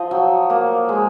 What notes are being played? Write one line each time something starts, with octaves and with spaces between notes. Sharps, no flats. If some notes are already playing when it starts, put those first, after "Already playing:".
Already playing: F3 D#5
F#3
A#3
G#3